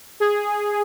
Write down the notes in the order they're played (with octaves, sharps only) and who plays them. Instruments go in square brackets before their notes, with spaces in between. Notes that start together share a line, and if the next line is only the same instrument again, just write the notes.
[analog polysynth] G#4